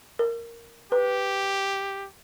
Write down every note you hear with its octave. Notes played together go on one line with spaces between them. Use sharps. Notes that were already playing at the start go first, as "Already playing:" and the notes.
A#4
G4 B4